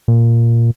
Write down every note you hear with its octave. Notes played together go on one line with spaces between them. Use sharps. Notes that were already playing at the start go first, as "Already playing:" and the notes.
A#2